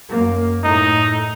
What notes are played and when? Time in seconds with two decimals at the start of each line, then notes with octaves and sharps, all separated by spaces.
0.11 F#2 A#3
0.64 A2 A3 D#4